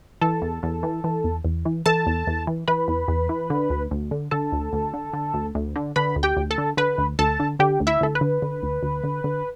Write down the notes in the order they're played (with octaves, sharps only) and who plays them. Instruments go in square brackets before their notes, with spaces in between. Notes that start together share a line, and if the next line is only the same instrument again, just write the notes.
[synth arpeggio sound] E3 A4 A5
E2
E2
E3
E3
E2
E2
E3
E3 A4 A5
E2
E2
E3
E3 B4 B5
E2
E2
E3
D3
D2
D2
D3
D3 A4 A5
D2
D2
D3
D3
D2
D2
D3
D3 B4 B5
D2
G4 G5
D2
A4 A5
D3
D3 B4 B5
D2
D2 A4 A5
D3
D3 G4 G5
D2
E4 E5
D2 A4
B4
D3
D3
D2
D2
D3
D3